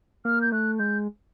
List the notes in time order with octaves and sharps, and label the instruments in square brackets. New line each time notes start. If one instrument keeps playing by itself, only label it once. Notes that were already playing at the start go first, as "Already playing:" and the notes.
[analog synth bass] A#3 [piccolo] F6
[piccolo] G6
[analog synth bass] A3 [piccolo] F#6
[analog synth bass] G#3 [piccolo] G6